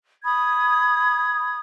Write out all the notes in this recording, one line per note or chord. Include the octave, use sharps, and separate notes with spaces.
B5 D#6 G#6